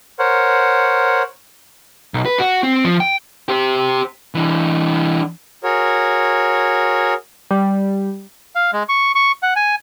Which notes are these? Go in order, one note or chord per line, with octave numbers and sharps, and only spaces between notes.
A#4 C5 C#5 F#5
B1
B4
F#4
C4
F3
G5
G4 C5
E3 D4
F#4 G#4 A#4 C#5
G3
F5
G#3
C#6
C#6
F#5
G#5